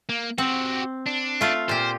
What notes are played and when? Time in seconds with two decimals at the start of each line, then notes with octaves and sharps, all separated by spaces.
0.09 A#3
0.38 C4 F#4 G4
1.07 D4
1.41 A3 F4
1.69 A#2 G4 C5